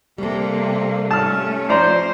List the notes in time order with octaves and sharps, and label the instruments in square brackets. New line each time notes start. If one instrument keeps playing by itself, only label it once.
[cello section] C3 A#3 [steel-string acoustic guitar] G3 A4
[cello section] A3 C#4 [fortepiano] A5 F6
[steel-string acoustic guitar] F3 [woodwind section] C5 [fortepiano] D5 A#5